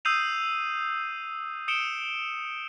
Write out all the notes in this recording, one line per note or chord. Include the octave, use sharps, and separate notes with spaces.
D#6 E6 G6 C7 D#7 F7
D#6 C#7 D7 E7 G7